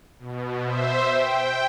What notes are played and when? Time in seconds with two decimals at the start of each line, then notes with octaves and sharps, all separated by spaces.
0.19 B2
0.64 C5 E5
1.06 G5